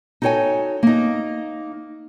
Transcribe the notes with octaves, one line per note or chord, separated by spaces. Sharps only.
D#4 F#4 A4 C#5 G5 G#5
A#3 D#4